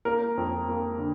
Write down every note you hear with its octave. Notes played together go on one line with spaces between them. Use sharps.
A#3 A#4
F2
A#3
D3